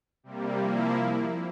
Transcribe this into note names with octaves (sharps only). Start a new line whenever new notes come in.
C3 G3 A#3
F3 A#3 E4